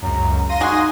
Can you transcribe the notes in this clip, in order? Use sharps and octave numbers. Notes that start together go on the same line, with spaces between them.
C#2 F#2 A#5
F5 C6 A#6 D#7
G#3 D#4 F#4 G#4